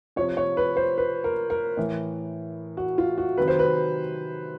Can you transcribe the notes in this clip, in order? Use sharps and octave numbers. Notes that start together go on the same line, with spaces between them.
C3 F3 C#5
C#5
B4
C5
B4
A#4
A#4
A2 E3
F#4
F4
F#4
C3 D#3 F#3 B4
C5
B4